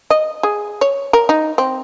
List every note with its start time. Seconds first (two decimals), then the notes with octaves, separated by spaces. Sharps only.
0.10 D#5
0.43 G#4
0.81 C#5
1.13 A#4
1.29 D#4
1.58 C4